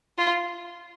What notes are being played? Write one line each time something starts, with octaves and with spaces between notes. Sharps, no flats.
F4